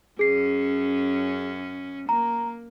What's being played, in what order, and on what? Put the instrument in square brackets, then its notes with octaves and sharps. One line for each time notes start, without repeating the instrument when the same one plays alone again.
[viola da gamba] F#2 C#4 [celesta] G#4 C7
[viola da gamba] A#3 [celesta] A#5